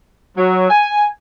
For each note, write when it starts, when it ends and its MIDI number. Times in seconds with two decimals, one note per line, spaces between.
0.37 0.68 54
0.70 1.07 80